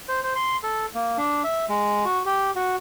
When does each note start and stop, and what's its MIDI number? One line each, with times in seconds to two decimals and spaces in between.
0.09 0.20 72
0.23 0.33 72
0.36 0.57 84
0.63 0.86 69
0.95 1.17 58
1.18 1.42 62
1.44 1.65 76
1.69 2.05 56
2.05 2.22 66
2.26 2.51 67
2.55 2.76 66